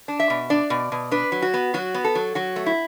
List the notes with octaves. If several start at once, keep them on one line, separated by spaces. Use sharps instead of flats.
D4
E5
B2
D4 D5
B2
B2
D4 B4
F#3
F#4
B3
F#3 F#4
B3
A4
F#3
F#3 F#4
A3
E4